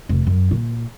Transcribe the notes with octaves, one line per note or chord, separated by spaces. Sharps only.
F1
F#2
A#2